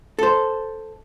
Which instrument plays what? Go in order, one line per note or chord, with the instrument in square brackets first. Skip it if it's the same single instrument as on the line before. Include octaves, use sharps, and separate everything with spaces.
[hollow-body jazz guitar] A4 C5